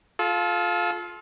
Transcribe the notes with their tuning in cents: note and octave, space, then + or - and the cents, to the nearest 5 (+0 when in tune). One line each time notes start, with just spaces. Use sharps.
F4 +10 A4 -30